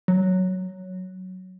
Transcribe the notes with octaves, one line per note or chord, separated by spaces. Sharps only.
F#3